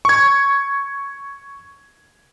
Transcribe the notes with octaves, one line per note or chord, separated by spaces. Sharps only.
C#6 G#6